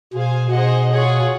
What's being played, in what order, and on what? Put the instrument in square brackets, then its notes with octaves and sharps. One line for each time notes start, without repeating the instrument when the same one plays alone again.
[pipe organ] B2 [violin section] G#4 C5 F5 G#5
[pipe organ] B2 [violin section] D#4 G#4 C5 D#5 F#5
[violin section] F4 G#4 C#5 F#5